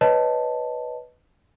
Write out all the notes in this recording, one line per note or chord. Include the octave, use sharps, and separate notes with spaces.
B4 C#5 D#5 A5